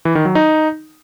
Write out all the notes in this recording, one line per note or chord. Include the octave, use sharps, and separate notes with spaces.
E3
D#3
F#3
D#4